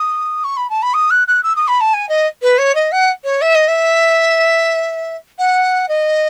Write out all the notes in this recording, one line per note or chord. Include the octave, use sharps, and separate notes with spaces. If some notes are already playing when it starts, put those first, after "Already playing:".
Already playing: D#6
C#6
B5
A5
B5
D#6
F#6
F#6
E6
D#6
B5
A5
G#5
D#5
B4
C#5
D#5
F#5
C#5
E5
D#5
E5
F#5
D#5